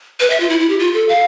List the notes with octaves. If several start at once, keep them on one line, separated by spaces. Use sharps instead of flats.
B4
E5
F4
E4
E4
G4
F4
A4
F5